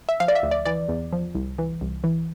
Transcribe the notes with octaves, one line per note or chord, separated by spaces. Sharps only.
E5
F3 F5
D5
E5
D2
D5
E3 D5
E2
F3
C2
E3
C2
E3